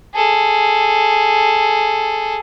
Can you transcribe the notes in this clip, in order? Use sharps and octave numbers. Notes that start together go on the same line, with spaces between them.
G#4 A4